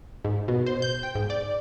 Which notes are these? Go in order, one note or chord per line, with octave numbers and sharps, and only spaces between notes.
G#2
B2
C5
G6
G5
G#2
D5